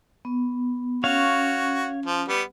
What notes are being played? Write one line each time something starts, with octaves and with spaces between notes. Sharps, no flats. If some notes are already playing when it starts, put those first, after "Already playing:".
B3
C#4 F#4 C#5 F5
F3
G3 B3